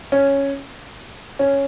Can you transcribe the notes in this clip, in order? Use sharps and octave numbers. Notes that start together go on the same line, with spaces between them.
C#4
C#4